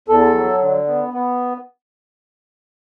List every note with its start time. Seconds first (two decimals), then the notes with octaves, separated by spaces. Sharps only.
0.08 E2 A4
0.34 F#3
0.61 D3
0.87 B3
1.14 B3